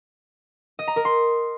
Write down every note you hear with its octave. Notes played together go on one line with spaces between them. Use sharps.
D#5
A#5
A#4
C6